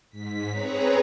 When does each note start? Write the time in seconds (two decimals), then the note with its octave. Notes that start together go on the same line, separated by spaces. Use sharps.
0.10 G#2 B6
0.49 C4 G#4 B4 C#5 A#5